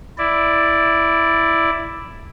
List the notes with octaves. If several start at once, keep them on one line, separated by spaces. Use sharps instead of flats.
E4 D5